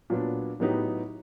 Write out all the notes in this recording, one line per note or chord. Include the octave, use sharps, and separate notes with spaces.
A#2 F#3 B3 D4
A2 F#3 B3 D#4 G4